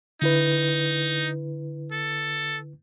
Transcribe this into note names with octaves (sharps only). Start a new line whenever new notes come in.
D3 D#4 E4 B4
A4